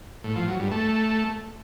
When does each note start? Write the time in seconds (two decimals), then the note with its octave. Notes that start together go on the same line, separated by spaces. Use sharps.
0.24 A2
0.36 F3
0.48 F#3
0.59 G2
0.71 A3